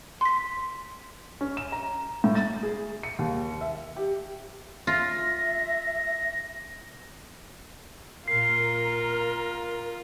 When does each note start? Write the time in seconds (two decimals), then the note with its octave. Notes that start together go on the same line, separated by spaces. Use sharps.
0.21 C6 B6
1.41 C#4
1.57 E7
1.72 A#5
2.24 A2
2.35 A6
2.63 G#4
3.03 C#7
3.19 D#2
3.61 E5
3.97 G4
4.87 F4 E5 A#6
8.28 A#2 F4 A#4 C7